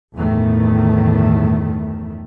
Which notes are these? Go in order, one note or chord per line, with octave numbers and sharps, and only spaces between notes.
G1 E2 A2 D#3 A3